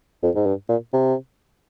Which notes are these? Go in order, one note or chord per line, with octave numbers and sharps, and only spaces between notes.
F2
G#2
G2
A#2
C3